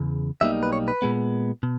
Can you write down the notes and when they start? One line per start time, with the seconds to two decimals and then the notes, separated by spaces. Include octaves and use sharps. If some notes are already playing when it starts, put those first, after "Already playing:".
Already playing: E2 C#3
0.41 B1 B2 G3 A#3 D#4 E5
0.63 B4
0.73 C#5
0.88 B4
1.02 A#2 G#3 B3
1.63 B2